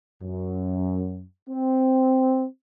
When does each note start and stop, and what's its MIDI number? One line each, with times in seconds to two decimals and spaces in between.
0.23 1.24 42
1.50 2.45 60